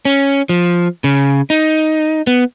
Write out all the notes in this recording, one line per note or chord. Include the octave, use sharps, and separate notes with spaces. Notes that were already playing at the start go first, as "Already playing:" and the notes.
C#4
F3
C#3
D#4
B3